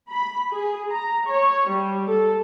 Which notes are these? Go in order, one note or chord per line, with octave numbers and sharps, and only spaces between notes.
B5
G#4
A#5
C#5
G3
A4